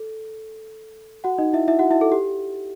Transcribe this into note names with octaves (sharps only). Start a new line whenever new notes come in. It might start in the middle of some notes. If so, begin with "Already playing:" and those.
Already playing: A4
F#4 F#5
D#4 D#5
E4 E5
E4 E5
F#4 F#5
E4 E5
A4
G4